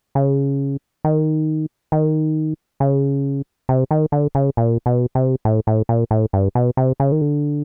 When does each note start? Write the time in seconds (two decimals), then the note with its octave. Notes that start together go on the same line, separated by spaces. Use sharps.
0.15 C#3
1.05 D#3
1.92 D#3
2.80 C#3
3.69 C3
3.91 D#3
4.12 D3
4.35 C#3
4.57 A#2
4.86 B2
5.15 C3
5.45 A2
5.67 A2
5.89 A#2
6.11 A2
6.33 G2
6.55 B2
6.77 C3
7.00 C#3
7.12 D#3
7.21 D3